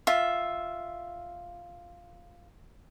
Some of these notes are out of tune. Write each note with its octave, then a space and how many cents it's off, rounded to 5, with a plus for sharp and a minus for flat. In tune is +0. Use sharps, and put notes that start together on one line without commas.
F4 +0 E5 +0